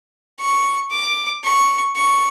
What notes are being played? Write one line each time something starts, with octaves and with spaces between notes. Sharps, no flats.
C#6
D6
C#6
C#6